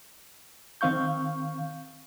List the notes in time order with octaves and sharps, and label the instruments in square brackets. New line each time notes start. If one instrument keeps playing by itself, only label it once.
[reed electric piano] D#3 C4 F5 C#6 G6